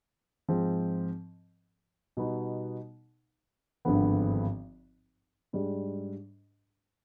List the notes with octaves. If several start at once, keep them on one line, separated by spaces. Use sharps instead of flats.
G#2 F3 C4
B2 G3 B3 D#4
G#1 G2 D3 F3 B3
G#2 G3 D4